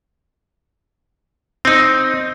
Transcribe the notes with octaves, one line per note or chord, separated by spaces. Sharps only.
C4 D#4